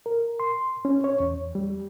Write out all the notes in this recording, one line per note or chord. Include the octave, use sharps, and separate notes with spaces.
A#4
C6
C#4
C#5
E2
G3